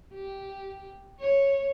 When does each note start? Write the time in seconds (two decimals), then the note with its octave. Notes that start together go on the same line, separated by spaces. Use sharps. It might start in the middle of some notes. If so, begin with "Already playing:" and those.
0.14 G4
1.20 C#5